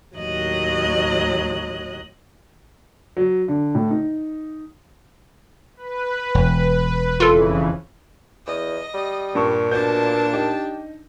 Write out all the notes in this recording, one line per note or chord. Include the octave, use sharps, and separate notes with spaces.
D#2 A2 F#3 D#5 F#6
F#3
D3
A2
D#4
B4
E1
F2 C#3 E3 F4 A4
E2 D#5
G3
G2 A#2 A5 C#6
B2 D4 A5 G6
D#4 G4